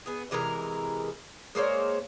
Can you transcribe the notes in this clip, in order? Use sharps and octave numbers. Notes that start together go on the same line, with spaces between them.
B3 G#4
C3 E3 G#3 A#4
G#3 A#3 C5 C#5